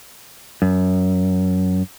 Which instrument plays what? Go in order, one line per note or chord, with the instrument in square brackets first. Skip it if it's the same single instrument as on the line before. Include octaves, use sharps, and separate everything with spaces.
[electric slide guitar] F#2